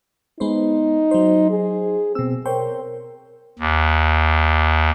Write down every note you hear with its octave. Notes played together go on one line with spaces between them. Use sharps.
G#3 B3 D#4 C5
F#3 C5
G#4
B2 C4 E6
A#4 C5 C#5 G5
D#2